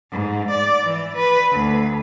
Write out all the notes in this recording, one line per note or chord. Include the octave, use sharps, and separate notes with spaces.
G#2
D5
E3
B4
D2